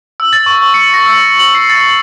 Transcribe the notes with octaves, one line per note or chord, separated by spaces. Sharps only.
E6
A6
C#6
C#6
C#7
A#6
E6
F#7
C7
A6